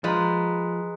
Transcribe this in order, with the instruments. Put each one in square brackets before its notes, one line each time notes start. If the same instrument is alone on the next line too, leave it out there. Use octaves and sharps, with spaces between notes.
[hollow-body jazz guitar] F3 [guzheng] G#3 B4 [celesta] A#5 C6 A6